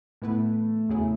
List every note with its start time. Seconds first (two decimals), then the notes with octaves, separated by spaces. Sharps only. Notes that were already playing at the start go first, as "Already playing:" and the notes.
0.22 A2 E3 A3 B3 E4 B4
0.89 E2 C#3 F#3 C#4 E4